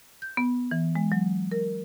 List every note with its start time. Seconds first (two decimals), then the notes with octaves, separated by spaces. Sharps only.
0.22 G6
0.37 B3
0.71 E3
0.95 G#3
1.12 F#3
1.51 A#4